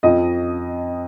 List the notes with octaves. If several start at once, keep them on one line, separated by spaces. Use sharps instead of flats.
F2 F3 D#5